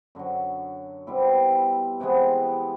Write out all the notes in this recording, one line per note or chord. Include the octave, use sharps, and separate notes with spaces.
F#2 D3 F#3
B2 G3 C4 E4
C3 E3 G#3 B3